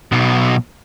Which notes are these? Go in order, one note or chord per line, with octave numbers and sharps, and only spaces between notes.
B1 B2